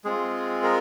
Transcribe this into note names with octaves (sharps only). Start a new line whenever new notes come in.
G#3 C4 F4 G#4
A#4